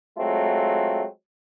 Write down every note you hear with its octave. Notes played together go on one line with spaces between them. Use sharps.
F#3 G#3 A3 C4 F4